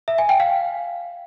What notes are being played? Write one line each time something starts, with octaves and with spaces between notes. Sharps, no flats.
E5
G#5
G5
F5